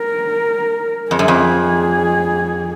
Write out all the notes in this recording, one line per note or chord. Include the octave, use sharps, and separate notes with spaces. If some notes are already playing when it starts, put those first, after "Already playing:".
Already playing: A#4
F2 G#4
F#2
F2